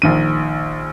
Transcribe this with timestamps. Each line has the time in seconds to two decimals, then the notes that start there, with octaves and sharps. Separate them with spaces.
0.02 A#1 D#3 D#7